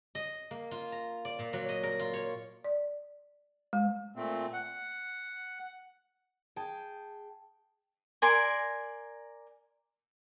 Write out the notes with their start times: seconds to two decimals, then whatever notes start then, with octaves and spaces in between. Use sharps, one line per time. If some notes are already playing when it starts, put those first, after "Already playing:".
0.15 D#5
0.51 A#3
0.71 F4
0.92 A#5
1.25 D5
1.39 A#2
1.53 F#3
1.69 D#5
1.83 A#4
2.00 F4
2.13 C#5
2.64 D5
3.73 G#3
4.16 A#2 A3 C4
4.53 F#5
6.56 G#4 G5 A5
8.22 A#4 D5 G#5 C6